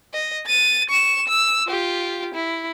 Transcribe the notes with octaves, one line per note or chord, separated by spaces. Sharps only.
D#5
A6 D#7
C#6 E7
E6
F4 G4
E4